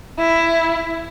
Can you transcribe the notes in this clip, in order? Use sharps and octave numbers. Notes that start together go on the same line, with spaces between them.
E4